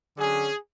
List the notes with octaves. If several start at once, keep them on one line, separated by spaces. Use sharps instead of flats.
D3 F#3 C#4 G#4